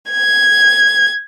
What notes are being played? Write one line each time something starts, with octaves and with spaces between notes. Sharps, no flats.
G#6